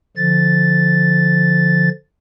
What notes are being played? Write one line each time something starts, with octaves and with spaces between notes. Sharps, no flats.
D3 F3 A6